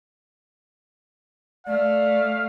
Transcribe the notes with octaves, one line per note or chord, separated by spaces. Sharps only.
A3 D5 F5